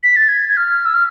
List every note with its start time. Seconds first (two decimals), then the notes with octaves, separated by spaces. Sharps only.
0.03 B6
0.16 A6
0.28 G#6
0.49 G#6
0.57 F6
0.85 E6
0.94 F6